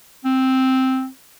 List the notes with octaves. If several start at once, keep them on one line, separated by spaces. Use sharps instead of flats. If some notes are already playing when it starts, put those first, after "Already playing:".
C4